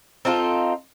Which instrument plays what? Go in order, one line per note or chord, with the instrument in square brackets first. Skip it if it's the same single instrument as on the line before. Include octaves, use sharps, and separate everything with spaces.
[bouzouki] C4 D#4 F4 A4